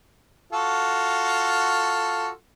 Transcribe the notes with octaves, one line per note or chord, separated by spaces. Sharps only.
F4 F#4 A4